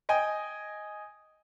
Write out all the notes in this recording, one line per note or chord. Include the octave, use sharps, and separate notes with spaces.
D#5 G5 G#5